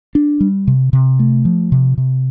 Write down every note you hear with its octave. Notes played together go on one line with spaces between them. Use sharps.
D4
G3
C3
C3
A3
F3
C3
C3